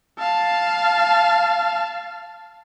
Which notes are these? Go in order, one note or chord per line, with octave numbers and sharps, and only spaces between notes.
F5 A5